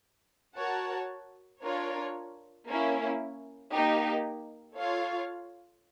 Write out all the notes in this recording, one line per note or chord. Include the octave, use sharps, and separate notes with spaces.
F#4 A#4 C#5 F#5 A5
D4 F4 A#4 C#5
A#3 C#4 E4
A#3 D#4 G4
F4 A4 C#5 F5